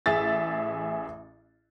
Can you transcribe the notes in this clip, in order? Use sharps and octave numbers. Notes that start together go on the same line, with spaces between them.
A1 G#4 E5 A6